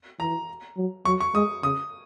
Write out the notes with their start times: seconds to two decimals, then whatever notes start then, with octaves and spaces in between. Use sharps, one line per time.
0.19 E3 A#5
0.77 F#3
1.05 F#3 C#6
1.20 C#6
1.35 G#3 D#6
1.63 C#3 D#6